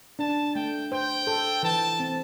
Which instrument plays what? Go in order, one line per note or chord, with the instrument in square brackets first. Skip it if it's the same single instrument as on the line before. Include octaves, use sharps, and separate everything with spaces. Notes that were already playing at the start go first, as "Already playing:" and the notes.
[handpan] D4 [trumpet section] A5
[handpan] A3 [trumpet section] G5
[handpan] C5 [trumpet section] G5
[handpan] A4
[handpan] E3 [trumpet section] A5
[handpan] C4